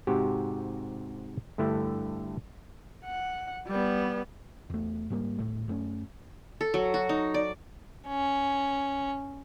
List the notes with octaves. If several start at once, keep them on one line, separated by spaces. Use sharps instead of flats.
G#2 C3 F#4 G4
G2 D3 A3 E4
F#5
G3 B3
E2 A3
G#2 G3 A#3
D#1 G#1 A2 A3
F#2 A3 B3 C#4
A4
F#3
F#4
D#4
D5
C#4